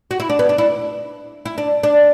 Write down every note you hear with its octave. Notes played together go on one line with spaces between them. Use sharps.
F#4
E4
D4
B3
D4
E4
E4
D4
D4